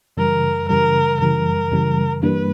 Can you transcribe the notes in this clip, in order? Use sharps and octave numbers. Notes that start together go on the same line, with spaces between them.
F#2 C#3 E3 G3 A#4
F#2 C#3 E3 G3 A#4
F#2 C#3 E3 G3 A#4
F#2 C#3 E3 G3
G2 E3 G3 A#3 D4 B4